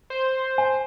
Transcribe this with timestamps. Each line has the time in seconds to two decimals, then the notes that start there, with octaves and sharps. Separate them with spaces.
0.10 C5
0.58 G#5